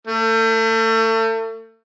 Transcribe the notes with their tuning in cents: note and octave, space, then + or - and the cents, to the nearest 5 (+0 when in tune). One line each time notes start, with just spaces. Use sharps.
A3 +35